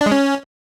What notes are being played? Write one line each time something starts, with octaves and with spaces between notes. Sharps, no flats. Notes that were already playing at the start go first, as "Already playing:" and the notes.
D4
G#3
C#4